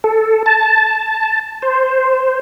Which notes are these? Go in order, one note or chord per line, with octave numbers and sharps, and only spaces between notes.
A4
A5
C5